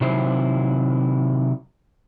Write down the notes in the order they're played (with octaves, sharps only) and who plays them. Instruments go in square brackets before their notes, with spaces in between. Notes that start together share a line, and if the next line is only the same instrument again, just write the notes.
[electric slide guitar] C3 D#3 F#3 E4 C5